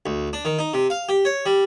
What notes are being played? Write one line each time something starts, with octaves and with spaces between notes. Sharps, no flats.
D2
D4
D#3
D#4
C3
F5
G4
C#5
G3